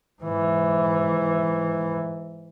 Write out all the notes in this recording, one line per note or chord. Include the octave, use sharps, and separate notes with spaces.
G#2 E3